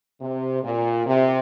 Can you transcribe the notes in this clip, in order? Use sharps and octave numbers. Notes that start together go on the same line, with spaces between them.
C3
A#2
C3